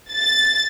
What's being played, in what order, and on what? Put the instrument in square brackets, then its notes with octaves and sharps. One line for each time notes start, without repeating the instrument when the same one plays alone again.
[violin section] A6